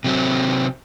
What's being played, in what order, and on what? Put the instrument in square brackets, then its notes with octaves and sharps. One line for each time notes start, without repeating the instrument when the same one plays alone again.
[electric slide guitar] C3 F#3 C4